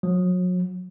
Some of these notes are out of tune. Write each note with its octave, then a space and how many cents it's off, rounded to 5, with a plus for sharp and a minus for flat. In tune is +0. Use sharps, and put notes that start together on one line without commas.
F#3 -35